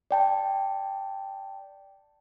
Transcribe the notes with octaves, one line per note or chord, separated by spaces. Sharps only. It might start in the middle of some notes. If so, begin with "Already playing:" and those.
D5 G5 A5